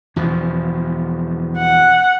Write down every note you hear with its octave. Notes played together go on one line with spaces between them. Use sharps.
E2 B2 F3
F#5